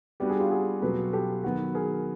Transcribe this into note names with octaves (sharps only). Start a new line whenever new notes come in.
G3 B3 D4 F#4 G4
G#4
F4 G4
F#4 G#4
B2 F#3 B3 A4 B4
G4 A4
D#3 F#3 B3 F#4
G#4 A#4